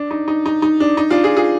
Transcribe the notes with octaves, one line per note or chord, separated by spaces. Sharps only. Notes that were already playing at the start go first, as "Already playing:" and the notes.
Already playing: D4
D#4
D#4
D#4
D#4
D4
D#4
D4 F4
F4 G#4
F4 G#4